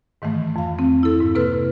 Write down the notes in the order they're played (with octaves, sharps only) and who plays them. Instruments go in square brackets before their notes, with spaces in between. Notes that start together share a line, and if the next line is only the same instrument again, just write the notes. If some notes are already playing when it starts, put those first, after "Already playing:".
[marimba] G#2 D#3 E3 A3
F2 F5
C4
E4 A4
G#2
C3 A#3 A4 B4 C6 F6